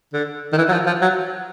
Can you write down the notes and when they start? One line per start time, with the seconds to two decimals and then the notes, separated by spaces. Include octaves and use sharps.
0.14 D3
0.53 D#3
0.58 E3
0.69 F#3
0.73 F3
0.87 F3
1.02 F#3